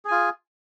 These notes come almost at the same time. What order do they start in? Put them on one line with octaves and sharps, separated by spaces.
G#4 G#5 F4